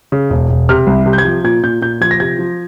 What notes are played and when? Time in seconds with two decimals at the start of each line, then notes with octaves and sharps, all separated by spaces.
0.12 C#3
0.30 E1
0.50 E1
0.69 C3 F6
0.87 C2
1.06 C3
1.13 G6
1.18 G#6
1.25 F3
1.44 A#2 G#6
1.63 A#2 G6
1.81 A#2 G6
2.01 F3 G#6
2.11 A#6
2.20 C3 G#6
2.39 F3